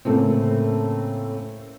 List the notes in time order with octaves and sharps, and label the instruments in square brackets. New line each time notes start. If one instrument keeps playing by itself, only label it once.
[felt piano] A2 C#3 A3 A#3 C4